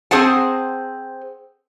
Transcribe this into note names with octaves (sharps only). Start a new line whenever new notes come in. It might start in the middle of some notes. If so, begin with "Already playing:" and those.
C4 G#4 C5 F#5 A5